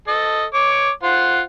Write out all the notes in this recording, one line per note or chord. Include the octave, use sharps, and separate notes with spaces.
A4 D#5
C#5 D6
F4 C5 F#5